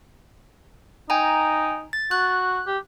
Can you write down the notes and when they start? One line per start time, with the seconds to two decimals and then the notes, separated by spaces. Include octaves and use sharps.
1.10 D#4 G5 G#5 A#5
1.93 A6
2.11 F#4 F#6
2.67 G4